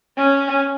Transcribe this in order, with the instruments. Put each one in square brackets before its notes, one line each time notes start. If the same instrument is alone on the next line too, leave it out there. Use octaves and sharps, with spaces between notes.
[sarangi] C#4